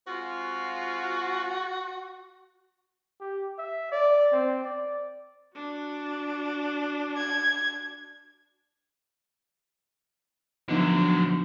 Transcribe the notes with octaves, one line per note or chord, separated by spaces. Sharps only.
G#3 C4 F4 F#4
G4
E5
D5
C4
D5
D4 F#4
G#6
D3 F3 F#3 B3 D#4